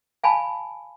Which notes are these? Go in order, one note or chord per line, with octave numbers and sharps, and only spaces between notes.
F5 G#5 A5 B5